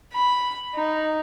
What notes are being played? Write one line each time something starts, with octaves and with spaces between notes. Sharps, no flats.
B5
D#4